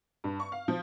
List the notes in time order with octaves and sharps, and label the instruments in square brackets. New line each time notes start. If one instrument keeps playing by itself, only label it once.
[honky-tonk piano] G2
C#6
F5
F3